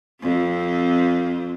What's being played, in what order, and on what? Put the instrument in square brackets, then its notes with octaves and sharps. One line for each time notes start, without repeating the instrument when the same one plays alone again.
[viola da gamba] F2 C4